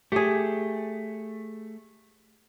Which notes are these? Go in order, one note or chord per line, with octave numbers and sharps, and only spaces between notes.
A3 G4 G#4